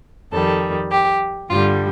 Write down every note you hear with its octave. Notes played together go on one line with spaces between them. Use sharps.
F2 D#3 G3 A4
G4
G2 D3 G3 F4